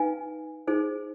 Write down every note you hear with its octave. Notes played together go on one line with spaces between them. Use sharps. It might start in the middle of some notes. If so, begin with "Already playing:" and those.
Already playing: D#4 B4 F5 G#5
D#4 G#4 C5